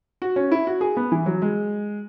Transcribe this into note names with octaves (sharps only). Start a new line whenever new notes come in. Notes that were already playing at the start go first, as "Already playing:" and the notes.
F#4
C#4
E4
F#4
G#4
B3
E3
F#3
G#3